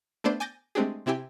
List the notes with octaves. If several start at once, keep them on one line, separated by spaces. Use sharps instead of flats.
A3 B3 D4 C5 D5
G#5 D6 G6 A6 A#6
G#3 A3 C4 D4 G4 G#4
C3 C4 E4 G4 G5 G#5